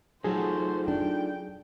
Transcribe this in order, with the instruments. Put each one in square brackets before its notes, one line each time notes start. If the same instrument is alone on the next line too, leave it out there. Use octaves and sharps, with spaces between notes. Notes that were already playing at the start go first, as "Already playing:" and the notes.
[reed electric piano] F#3 G#4 [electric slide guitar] D#4 F4 A4 [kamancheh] F#4 C5
[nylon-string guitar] D4 [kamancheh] G5